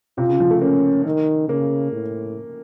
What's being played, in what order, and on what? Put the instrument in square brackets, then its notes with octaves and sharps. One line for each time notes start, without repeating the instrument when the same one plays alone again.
[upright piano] C3 [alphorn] F4
[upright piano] C#3
F3
A3
[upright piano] A#3 [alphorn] C#4
[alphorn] D#3
[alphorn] C#3 [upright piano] A#3
[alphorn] A2